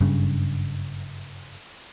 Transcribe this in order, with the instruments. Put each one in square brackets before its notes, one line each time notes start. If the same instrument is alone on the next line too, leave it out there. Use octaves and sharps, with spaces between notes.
[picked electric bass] F#1 G2 C#3